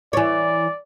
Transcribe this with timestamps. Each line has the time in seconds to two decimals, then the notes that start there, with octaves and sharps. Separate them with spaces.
0.13 E3 C#5 D5